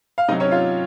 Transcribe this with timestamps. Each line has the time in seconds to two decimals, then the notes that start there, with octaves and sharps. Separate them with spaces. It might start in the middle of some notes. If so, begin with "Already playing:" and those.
0.18 F5
0.28 C3 D#4 D#5
0.32 F#3
0.40 C#4 C#5
0.51 F4 F5